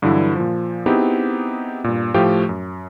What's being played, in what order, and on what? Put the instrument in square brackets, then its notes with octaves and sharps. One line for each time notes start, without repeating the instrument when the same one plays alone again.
[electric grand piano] G2 D3 E3 F#3 E4
A#2 F3
B3 C4 D#4 E4 G4 G#4
G2 A#2
A2 F3 A3 G4 F5 G5
F#2